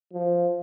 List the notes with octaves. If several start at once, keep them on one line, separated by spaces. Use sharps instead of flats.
F3